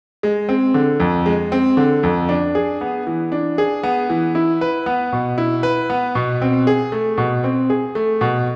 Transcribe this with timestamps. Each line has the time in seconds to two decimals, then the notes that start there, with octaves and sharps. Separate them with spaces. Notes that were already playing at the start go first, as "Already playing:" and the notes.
0.23 G#3
0.49 C4
0.74 D3
1.00 F2
1.26 G#3
1.52 C4
1.77 D3
2.03 F2
2.29 D4
2.55 G#4
2.81 B3
3.07 E3
3.32 D4
3.58 G#4
3.83 B3
4.10 E3
4.35 E4
4.61 B4
4.86 B3
5.12 B2
5.38 E4
5.63 B4
5.90 B3
6.15 B2
6.42 C4
6.67 G#4
6.92 A3
7.18 B2
7.44 C4
7.70 G#4
7.95 A3
8.21 B2